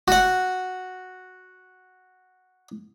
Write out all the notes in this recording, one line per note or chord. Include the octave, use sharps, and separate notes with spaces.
F#4 F#5